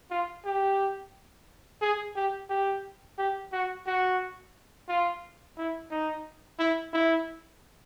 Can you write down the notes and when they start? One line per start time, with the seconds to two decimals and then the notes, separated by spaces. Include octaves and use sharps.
0.11 F4
0.45 G4
1.82 G#4
2.16 G4
2.50 G4
3.18 G4
3.53 F#4
3.87 F#4
4.89 F4
5.58 E4
5.91 D#4
6.59 E4
6.93 E4